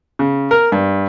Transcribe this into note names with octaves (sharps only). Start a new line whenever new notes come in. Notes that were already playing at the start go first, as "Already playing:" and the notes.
C#3
A#4
G2